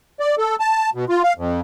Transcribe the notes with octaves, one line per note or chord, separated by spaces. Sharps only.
D5
A4
A5
B2
F4
F5
F2